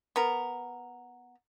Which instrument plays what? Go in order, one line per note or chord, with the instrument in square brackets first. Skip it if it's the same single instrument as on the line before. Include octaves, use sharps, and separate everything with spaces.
[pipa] B3 A#4